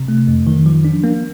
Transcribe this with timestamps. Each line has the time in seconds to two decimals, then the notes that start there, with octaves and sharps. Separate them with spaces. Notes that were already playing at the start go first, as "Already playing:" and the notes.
Already playing: C3
0.08 A3
0.28 F2
0.47 D#3
0.66 F3
0.85 D4
1.04 A#3